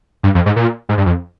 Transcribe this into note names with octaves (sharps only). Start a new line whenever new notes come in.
G2
F2
G#2
A#2
G#2
G2
F2